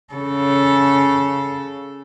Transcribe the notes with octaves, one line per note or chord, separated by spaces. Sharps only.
C#3 A4